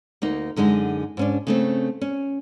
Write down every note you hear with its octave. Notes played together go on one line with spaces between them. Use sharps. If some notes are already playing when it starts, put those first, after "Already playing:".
D2 A#3 D#4
F#2 D3 G#3 D#4
G#2 C#4 D4
C#3 A3 C4
C#4